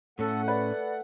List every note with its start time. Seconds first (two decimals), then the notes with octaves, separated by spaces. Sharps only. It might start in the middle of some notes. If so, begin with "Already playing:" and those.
0.19 A2 A3 C#4 A4 F#5
0.48 B4 D5